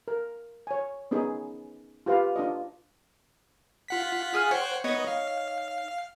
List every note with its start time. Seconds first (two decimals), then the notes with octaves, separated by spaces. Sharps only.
0.08 A#4
0.67 C#5 G#5
1.11 B3 C#4 D#4 G#4
2.06 F4 G4 B4 F5
2.36 D4 F4 D#5
3.88 F4 F#5 B6
4.34 G#4 G#5 F6
4.51 C5 C#5 F#5 G5
4.84 B3 D#4 C#5 D#5
5.07 F5